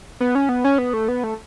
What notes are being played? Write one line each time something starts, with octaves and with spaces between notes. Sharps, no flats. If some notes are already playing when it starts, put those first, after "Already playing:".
B3
C#4
B3
C#4
B3
A3
B3
A3